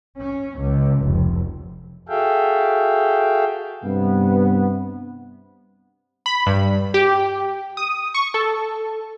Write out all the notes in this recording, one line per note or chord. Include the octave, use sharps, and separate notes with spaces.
C#4
C#2
F1
F#4 G#4 A4 E5 F5 G5
G2 C3 B3
B5
G2
G4
D#6
C#6
A4